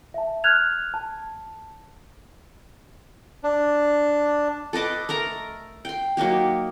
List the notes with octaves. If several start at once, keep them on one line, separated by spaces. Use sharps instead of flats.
E5 A5
F6 F#6 G#6 F7
A5
D4
A4 B4 D#5 D6
A3 A#4 A#5
G5 C6
F#3 A#3 D#4 G4